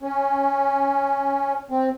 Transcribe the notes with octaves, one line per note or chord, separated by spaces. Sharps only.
C#4
C4